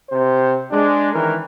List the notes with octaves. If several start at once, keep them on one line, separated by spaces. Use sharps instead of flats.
C3 C5
G#3 D4
D#3 E3 C#4 A#4